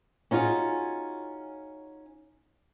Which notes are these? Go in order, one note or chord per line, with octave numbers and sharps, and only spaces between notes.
C#4 D#4 F4 F#4 G#4